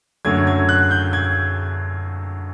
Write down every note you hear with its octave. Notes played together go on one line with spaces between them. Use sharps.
F#2 D3 F#3 A3 G#6
G#6
F#6
G6
G#6